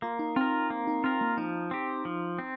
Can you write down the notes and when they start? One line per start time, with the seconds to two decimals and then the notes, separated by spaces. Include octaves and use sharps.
0.02 A#3 F4
0.19 D#4
0.36 C4 F4 A#4
0.70 A#3
0.87 D#4
1.04 C4 F4 A#4
1.21 A#3
1.37 F3 D#4
1.71 C4 G4
2.05 F3
2.39 C4